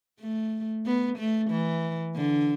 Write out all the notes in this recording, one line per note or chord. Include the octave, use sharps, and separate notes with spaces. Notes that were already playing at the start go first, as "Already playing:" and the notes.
A3
B3
A3
E3
D3